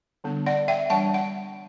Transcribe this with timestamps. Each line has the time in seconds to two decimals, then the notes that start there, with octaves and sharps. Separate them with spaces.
0.24 D3 G3 B3 D4
0.46 D5 F#5
0.68 E5 G5
0.90 E3 G3 D4 F#5 A5
1.14 F#5